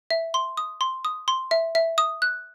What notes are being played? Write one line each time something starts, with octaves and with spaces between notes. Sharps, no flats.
E5
C6
D#6
C6
D#6
C6
E5
E5
D#6
F#6